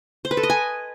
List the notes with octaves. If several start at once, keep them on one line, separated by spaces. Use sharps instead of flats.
C5
B4
A4
D#5
G#5